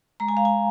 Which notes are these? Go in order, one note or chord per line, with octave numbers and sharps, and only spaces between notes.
G#3 A#5
G#5
F5
G#5